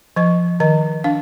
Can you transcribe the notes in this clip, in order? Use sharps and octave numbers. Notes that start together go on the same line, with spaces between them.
F3 D#5
D#3 D#5
D4 F5